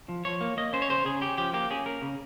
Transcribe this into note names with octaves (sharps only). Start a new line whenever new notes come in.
F3
F3 C#5
A#3
A#3 D#5
C#4 C5
C#5
C#3 C5
C#3 G#4
C#4 G4
F3 G4
A#3 G4
C#4 G#4
A#3 A#4
C#3